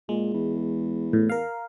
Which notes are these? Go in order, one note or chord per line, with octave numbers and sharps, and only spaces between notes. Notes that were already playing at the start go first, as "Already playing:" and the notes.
A#2 G#3
E2
A2
A#4 F5